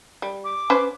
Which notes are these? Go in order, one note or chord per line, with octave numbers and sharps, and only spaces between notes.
G3
D6
C#4 B4 C5